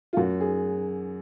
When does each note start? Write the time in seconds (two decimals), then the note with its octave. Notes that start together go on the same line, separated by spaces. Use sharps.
0.13 F4
0.17 F#2 F#4
0.41 G#4